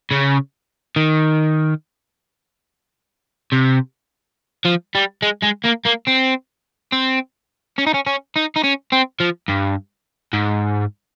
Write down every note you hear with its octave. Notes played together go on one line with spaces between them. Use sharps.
C#3
D#3
C3
F3
G3
G#3
G#3
A#3
A#3
C4
C4
C#4
D#4
C#4
C#4
D#4
D#4
C#4
C4
F3
G2
G#2